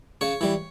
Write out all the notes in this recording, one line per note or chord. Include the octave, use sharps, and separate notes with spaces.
C#3 C#5
E3 G3